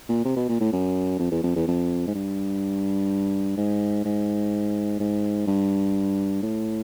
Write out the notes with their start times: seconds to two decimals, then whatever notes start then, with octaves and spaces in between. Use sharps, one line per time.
0.09 A#2
0.25 C3
0.37 B2
0.49 A#2
0.61 A2
0.72 F#2
1.20 F2
1.32 E2
1.43 F2
1.56 E2
1.67 F2
2.07 G#2
2.15 G2
3.57 G#2
4.05 G#2
5.00 G#2
5.47 G2
6.43 A2